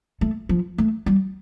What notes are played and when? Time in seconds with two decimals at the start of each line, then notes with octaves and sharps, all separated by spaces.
0.21 A3
0.49 F3
0.78 A3
1.06 G3